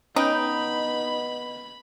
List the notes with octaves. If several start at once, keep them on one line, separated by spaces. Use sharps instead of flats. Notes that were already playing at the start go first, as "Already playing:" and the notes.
B3 C#4 D#4 B4 D#5 G5 B5